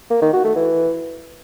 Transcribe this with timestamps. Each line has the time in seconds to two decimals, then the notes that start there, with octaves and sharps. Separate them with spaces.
0.10 A#3
0.22 D#3
0.33 F#4
0.44 A3
0.56 E3